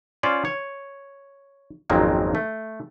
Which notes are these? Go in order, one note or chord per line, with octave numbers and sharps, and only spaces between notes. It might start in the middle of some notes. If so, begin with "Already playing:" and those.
C#4 F4 C5 D5
C#5
G#1 F2 C#3 F#3 A#3 C4
A3